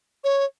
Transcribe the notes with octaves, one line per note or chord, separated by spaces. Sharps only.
C#5